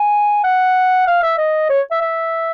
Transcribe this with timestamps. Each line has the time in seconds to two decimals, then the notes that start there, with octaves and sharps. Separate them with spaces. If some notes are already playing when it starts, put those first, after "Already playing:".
Already playing: G#5
0.44 F#5
1.07 F5
1.23 E5
1.38 D#5
1.70 C#5
1.91 E5
2.01 E5